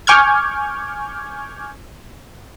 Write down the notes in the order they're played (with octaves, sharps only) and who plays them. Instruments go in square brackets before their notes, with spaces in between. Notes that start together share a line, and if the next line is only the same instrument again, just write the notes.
[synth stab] G#5 C#6 D6 F6 G6 G#6